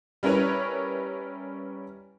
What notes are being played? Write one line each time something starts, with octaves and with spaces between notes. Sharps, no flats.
G3 C#4 E4 A#4 B4 C#5